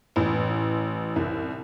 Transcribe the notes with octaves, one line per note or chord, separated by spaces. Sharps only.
A1
C2